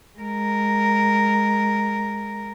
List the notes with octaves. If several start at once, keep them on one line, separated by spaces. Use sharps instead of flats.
G#3 A#4